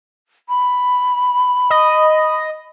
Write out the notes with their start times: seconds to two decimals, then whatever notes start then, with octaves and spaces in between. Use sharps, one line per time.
0.49 B5
1.70 D#5